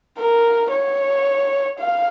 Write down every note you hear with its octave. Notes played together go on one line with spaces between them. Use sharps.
A#4
C#5
F5